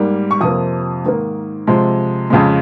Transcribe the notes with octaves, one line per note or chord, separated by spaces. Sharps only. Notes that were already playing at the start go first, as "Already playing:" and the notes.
Already playing: G#2 G3 A#3
C#6
F2 C3 F3 A#3 D#6
G#2 D#3 A#3
C3 F3 G#3
F2 C#3 G#3